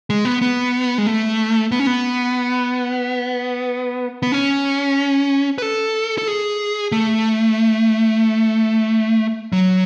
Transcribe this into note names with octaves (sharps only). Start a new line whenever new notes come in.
G#3
B3
B3
G#3
A3
B3
C#4
B3
B3
C#4
B4
A4
A4
G#4
A3
F#3